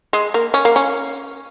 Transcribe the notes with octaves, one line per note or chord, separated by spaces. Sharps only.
G#3
A#3
C#4
A#3
C#4